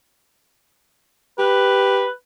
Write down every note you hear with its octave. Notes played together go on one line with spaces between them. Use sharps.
G4 B4